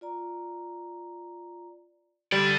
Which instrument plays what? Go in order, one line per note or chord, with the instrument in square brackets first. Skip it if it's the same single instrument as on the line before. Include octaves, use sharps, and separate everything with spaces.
[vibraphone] F4 D5 A#5
[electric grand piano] G3 [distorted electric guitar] A4 D5